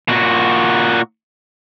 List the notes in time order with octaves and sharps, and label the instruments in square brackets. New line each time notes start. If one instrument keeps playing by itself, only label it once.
[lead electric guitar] A#2 F#4